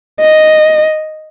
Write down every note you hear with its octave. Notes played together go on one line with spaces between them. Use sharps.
D#5